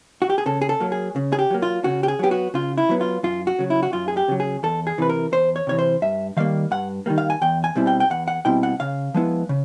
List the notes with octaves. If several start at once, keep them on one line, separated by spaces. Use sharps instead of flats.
F#4
G4
G#4
C#3 A4
G#4
A4
F#3 A#3
G#4
C#3
G#4
G4
F#3 A#3
F4
C#3 F#4
G4
G#4
F#3 B3 G4
F#4
C#3 F4
E4
F#3 B3
F4
F#2 F4
F#4
C#3 F#3
E4
F#4
F#2 F4
G#4
G4
C#3 F#3
G#4
E2 A4
G#4
C3 E3 B4
A#4
E2 C5
C#5
C3 E3 C#5
C5
G2 E5
D#3 G3 A#3 F5
G2 F#5
D#3 G3 A#3
F5
G#5
E2 G5
G#5
B2 G3 C4 E4
G5
G5
E2 F#5
F#5
B2 G3 C4 E4 G5
F#5
C#3 F5
F3 G#3 B3 E4
C#3